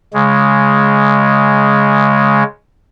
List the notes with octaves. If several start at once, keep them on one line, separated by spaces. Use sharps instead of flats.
C#3 G#3